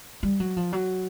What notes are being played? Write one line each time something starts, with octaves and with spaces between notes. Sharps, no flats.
G3
F#3
F3
F#3